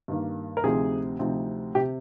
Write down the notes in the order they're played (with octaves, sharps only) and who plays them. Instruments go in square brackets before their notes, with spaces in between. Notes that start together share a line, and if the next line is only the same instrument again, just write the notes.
[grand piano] G2 D#3 A#3
A#4
D2 C3 F3 C4 D#4 G#4
D2 C3 F3 C4 D#4
C3 G4